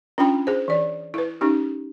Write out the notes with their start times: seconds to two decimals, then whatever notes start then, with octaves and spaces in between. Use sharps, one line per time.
0.18 C#4 D4 F4 G5 B5
0.47 G#4 C5
0.68 E3 D5
1.14 E4 B4
1.41 C#4 D#4 G4